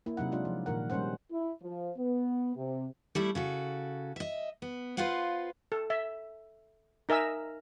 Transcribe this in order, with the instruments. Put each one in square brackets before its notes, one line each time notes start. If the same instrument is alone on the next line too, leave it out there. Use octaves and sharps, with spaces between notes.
[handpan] A#3 E4
C3 F#3 D#4 F#5
G#3 D4 F4
F3
A#2 D#3 A#4 F#5
G3 G#3 C#4 C5 F#5
[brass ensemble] E4
F3
B3
C3
[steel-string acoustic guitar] G3 A3 E4
C#3 F#4 A4
D#5 E5
B3
F4 B4 C5 F5 F#5
[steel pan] A4
E5
D#4 A#4 E5 G#5 E6